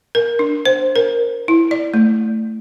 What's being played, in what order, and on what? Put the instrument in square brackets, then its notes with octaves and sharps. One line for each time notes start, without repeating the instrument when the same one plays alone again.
[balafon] A#4
D4
C5
A#4
E4
D5
A3